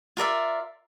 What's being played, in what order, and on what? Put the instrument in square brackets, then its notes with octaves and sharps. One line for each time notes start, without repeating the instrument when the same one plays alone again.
[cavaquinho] F4 A#4 D5 E5